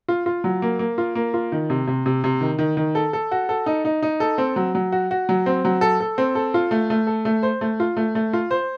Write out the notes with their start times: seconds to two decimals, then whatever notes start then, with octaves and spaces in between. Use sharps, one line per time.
0.08 F4
0.26 F4
0.44 F#3
0.62 A#3
0.79 A#3
0.98 F4
1.15 A#3
1.34 F4
1.52 D#3
1.70 C3
1.87 C3
2.06 C3
2.24 C3
2.41 D#3
2.59 D#3
2.77 D#3
2.95 A4
3.13 A4
3.31 F#4
3.49 A4
3.66 D#4
3.85 D#4
4.02 D#4
4.20 A4
4.38 C4
4.56 F#3
4.75 F#3
4.92 F#4
5.11 F#4
5.29 F#3
5.46 C4
5.65 F#3
5.81 A4
6.00 A4
6.18 C4
6.35 A4
6.54 F4
6.71 A3
6.90 A3
7.07 A4
7.25 A3
7.43 C5
7.61 A3
7.80 F4
7.97 A3
8.15 A3
8.33 F4
8.51 C5